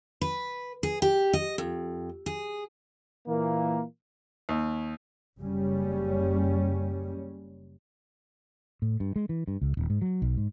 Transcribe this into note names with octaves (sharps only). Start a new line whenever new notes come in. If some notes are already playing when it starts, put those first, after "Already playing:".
B4
G#4
G4
D#5
F2
G#4
A#2 E3 A#3
D#2
F#1 C#3 G3 C#4
A2
G2
G#3
E3
G2
C#2
D#1
G#2
F#3
B1
G#2